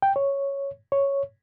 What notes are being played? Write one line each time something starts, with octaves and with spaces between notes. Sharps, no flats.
G5
C#5
C#5